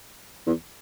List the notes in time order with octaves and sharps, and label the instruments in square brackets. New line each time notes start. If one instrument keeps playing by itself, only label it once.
[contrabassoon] E2